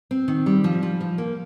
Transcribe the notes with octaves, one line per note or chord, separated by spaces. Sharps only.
C4
D#3
G3
F3
F3
F3
A#3